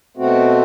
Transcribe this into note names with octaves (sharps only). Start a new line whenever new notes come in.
B2 A3 C4 F#4